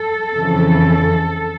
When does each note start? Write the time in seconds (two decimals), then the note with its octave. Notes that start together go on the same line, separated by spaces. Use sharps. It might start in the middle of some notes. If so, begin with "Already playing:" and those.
Already playing: A4
0.36 F2 C#3 E3